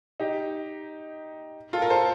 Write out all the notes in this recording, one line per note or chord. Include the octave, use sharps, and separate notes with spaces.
D#4 G4
F4 A4
A#4
A4 C5